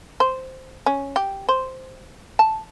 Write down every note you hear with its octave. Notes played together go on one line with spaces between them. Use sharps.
C5
C#4
G4
C5
A5